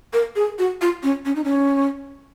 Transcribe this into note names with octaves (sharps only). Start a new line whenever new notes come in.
A#4
G#4
F#4
F4
C#4
C#4
D#4
C#4